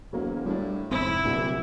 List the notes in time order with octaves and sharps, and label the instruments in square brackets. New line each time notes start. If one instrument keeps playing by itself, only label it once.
[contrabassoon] E1 [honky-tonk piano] F#3 A#3
[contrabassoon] A2 [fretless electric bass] G3 C4 D4
[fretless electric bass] F1 G#2 [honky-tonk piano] C4 [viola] E4
[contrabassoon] D1 [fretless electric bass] C2 A#2 D3